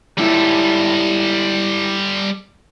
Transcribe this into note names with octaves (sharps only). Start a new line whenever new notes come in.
G#2 G3 E4 A4